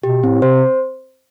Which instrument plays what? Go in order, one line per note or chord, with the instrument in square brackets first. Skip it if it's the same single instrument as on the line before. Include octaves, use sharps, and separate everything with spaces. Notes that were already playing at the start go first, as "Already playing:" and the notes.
[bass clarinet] B2 [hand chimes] G4
[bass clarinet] A2 [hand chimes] C4
[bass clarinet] C3 [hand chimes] C5